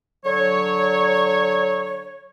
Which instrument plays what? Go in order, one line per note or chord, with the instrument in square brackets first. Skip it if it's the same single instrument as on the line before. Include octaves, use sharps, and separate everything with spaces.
[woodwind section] D3 F#3 C#5